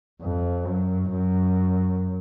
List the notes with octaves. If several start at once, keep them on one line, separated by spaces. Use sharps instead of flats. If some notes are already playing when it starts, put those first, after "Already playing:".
F2
F#2
F#2